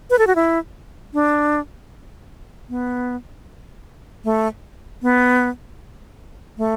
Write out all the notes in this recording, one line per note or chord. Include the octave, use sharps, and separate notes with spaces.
B4
A4
F#4
E4
D4
B3
A3
B3
A3